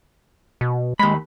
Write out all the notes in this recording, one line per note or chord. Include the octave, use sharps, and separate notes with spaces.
B2
D#2 G#3 B5